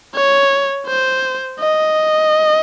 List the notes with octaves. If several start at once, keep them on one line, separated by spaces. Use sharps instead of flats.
C#5
C5
D#5